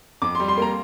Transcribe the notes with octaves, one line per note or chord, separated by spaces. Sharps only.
F2 D6
C6
G3
C6
A#3 A#5